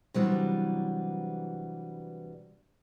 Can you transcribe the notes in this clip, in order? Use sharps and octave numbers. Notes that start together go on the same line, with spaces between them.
C3 E3 F#3 G3 B3 D4